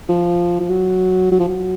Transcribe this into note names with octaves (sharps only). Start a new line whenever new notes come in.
F3
F3
F#3
F#3
F3
F#3